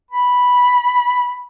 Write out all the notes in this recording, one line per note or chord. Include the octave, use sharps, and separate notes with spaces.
B5